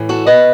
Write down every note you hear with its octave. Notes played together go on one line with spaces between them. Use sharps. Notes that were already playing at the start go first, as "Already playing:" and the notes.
Already playing: A2 E3
F#4 A4
B2 B4 D#5